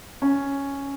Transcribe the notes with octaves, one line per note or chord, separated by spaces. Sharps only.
C#4